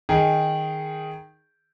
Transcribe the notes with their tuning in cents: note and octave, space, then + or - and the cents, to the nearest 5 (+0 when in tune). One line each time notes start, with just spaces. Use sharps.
D#3 +0 D#4 +0 G#4 +0